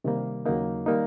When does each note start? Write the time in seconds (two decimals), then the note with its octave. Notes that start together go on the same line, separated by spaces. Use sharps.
0.04 C3 D#3 G3 A#3
0.46 D#2 C#3 F#3 A#3 D#4
0.86 D#3 G3 A#3 D#4